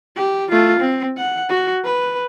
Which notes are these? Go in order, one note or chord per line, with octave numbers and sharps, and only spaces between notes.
G4
A3 F4
C4
F#5
F#4
B4